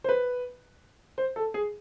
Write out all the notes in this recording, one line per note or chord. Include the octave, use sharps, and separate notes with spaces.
C5
B4
C5
A4
G#4